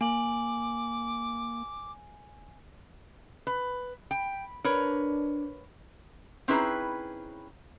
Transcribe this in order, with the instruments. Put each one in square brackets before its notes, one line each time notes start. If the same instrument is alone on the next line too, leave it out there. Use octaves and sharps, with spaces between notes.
[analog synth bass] A#3 [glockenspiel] G#5 F#7 [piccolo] D6
[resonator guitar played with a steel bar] B4
[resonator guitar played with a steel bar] G5 [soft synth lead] B5
[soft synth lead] D4 [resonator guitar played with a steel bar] A#4 B4 C#5
[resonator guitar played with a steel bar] C4 C#4 D#4 E4 G#4 B4